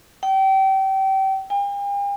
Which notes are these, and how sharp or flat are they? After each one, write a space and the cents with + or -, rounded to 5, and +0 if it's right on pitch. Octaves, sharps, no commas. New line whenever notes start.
G5 -30
G5 +45